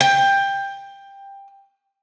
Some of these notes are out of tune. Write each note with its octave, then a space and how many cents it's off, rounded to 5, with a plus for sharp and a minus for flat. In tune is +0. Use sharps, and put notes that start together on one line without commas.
G5 +15